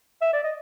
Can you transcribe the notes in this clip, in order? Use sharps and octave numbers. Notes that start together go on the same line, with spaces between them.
E5
D5
D#5